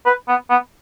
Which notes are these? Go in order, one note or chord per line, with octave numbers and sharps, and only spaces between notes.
B4
B3
B3